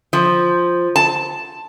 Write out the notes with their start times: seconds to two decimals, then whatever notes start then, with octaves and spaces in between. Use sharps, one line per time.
0.13 F3
0.96 A5